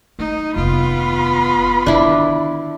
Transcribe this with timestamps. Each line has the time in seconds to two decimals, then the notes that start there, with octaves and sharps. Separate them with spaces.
0.19 A3 D#4
0.56 F1 D#2 B3 F4 B5
1.86 D3 D#3 D4 E4